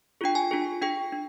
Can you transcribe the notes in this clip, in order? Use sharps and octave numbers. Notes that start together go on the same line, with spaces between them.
D4 F4 G#4 G5
G#5
D4 F4 G#4
D4 G#4 G5
D4